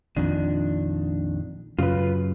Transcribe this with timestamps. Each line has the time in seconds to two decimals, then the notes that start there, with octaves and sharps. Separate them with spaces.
0.16 A#1 F2 D#3 D4
1.79 F#2 C#3 F#3 F4 B4